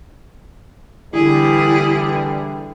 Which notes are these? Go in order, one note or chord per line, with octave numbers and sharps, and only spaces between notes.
D3 E3 G3 E4 G#4